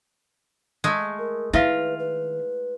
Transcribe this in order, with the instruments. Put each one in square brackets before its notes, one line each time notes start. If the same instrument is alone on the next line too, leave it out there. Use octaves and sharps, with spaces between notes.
[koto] G#3 A3
[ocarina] A#4
[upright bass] D#3 [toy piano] E4 E5 F5 [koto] F4 [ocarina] B4
[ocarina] B4